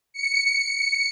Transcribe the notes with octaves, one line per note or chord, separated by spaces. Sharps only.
C#7